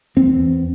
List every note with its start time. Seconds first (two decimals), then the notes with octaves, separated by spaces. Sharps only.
0.16 E2 C4
0.39 E2